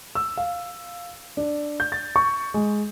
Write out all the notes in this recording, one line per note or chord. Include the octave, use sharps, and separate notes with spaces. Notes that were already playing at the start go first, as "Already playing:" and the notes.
E6
F5
D4
G6
A6
C#6
G#3